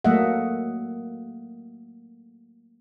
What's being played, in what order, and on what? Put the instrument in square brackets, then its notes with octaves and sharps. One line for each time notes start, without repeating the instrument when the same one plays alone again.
[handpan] F#3 A3 A#3 D#5 E5 F#5